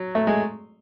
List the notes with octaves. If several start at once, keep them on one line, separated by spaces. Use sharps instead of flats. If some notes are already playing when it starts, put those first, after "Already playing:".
Already playing: F#3
A3
G#3